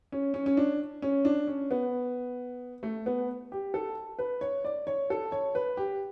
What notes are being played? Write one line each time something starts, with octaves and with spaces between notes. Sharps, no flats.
C#4
C#4
C#4
D4
C#4
D4
C#4
B3
A3
B3
G4
A4
B4
C#5
D5
C#5
A4
C#5
B4
G4